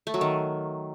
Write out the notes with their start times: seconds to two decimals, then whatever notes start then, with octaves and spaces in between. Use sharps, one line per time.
0.07 A3
0.14 F#3
0.21 D#3